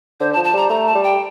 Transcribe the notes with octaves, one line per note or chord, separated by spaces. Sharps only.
D3 C5
A5
F3
A5
G3 A#5
A3 A#5
A5
G3
G5